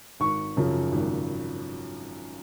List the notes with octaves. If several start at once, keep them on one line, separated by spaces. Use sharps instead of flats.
G#1 C#6
F#2 C#3 F3
G#1